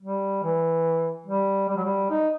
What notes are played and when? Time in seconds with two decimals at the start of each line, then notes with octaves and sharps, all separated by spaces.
0.02 G3
0.43 E3
1.26 G3
1.69 G3
1.77 F#3
1.84 G3
2.10 D#4